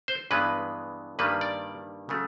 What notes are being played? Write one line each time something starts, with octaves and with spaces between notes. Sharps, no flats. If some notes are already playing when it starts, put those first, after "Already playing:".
C5
G2 E3 G#3 B3 B4
G2 D#3 G3 A#3 B4
D5
C#3 F#3 A3